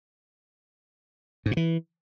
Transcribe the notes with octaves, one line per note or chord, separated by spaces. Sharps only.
G#2
A#2
E3